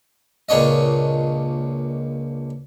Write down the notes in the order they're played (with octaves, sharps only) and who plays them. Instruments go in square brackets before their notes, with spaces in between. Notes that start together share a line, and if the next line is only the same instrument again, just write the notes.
[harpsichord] C#2 A#2 D4 C#5 D#5